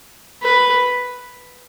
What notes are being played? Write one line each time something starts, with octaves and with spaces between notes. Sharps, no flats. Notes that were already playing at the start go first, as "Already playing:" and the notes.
B4